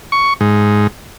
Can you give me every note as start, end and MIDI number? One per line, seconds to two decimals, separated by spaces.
0.12 0.34 85
0.41 0.87 44